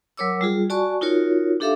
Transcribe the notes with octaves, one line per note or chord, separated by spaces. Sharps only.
F#3 A#4 C#5 D6 E6
G3 F4 G#4
F#4 D5 G#5 A5 C#6
D#4 F4 F#4 A#4 C#5
D4 G4 A4 E5 F5 D6